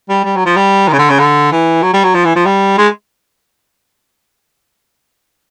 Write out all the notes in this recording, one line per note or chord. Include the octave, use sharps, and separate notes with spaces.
G3
G3
F#3
F3
G3
D#3
C#3
D3
C#3
D3
E3
F#3
G3
F#3
F3
E3
F3
G3
G#3